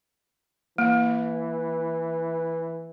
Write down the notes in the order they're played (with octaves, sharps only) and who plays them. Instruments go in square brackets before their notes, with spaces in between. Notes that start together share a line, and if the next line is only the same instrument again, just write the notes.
[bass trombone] E3 [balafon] A#3